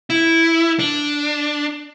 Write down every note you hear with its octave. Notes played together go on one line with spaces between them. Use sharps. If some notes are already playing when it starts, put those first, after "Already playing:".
E4
D4